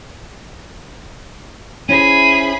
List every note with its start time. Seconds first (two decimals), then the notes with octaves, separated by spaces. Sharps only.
1.89 C#4 E4 G#4 C5 B5 D#7